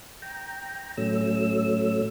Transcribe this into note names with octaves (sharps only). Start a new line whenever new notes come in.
G5 A#5
A2 F#3 A3 C#4 E6